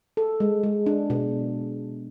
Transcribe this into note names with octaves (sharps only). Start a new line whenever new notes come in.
A4
G#3
G#3
D4
B2